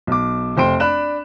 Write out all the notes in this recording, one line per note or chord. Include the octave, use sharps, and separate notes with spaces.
B1 D6
F1 C5 G5 C6 D7
D4 B5 F#6 E7